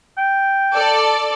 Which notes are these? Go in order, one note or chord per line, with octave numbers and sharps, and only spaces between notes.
G5
A4 D5